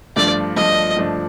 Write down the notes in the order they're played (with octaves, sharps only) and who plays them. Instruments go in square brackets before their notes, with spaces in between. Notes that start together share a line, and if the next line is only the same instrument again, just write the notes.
[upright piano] G2 F3 A3 D4 [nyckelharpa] D5
[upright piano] G2 F3 A3 D4 [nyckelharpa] D#5
[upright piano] G2 F3 A3 D4